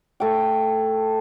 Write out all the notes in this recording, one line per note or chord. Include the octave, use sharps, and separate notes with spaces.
A3 G5